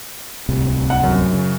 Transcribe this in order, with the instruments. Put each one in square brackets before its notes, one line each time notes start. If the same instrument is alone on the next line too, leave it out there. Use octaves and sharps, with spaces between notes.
[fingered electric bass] D1 C2 C3
[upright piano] F#5
F#2
[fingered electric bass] C#3